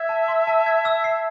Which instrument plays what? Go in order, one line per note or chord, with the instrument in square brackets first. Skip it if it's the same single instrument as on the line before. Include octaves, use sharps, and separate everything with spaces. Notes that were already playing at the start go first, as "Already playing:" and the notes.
Already playing: [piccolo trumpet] E5 [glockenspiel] G#6
[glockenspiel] A5
C6
A5
G#6
E6
C7